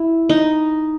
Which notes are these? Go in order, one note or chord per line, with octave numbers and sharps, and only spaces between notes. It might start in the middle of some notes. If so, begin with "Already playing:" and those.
Already playing: E4
D#4